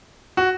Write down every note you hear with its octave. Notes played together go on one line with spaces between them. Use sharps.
F#4